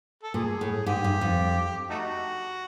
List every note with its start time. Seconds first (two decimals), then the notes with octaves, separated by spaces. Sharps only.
0.23 A4
0.34 A#2 G#4
0.61 A2
0.86 G#2 G4
1.04 G2
1.21 F2
1.90 A3 D#4 F#4